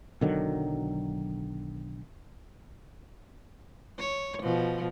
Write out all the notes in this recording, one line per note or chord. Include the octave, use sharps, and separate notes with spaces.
B1 D3 D#3 F#3
C#5
B2 F3